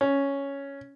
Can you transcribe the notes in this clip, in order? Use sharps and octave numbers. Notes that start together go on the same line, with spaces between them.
C#4